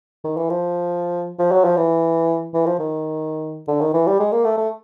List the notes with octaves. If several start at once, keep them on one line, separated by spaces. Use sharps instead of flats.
D#3
E3
F3
F3
F#3
F3
E3
E3
F3
D#3
D3
D#3
E3
G3
G#3
A#3
A3
A3